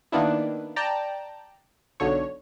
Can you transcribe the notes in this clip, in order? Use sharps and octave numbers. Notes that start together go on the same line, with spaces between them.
D#3 A#3 B3 D4 E4
D5 G5 A5 A#5
B1 D3 C#5